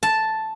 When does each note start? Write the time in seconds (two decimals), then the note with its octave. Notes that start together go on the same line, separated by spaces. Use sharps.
0.03 A5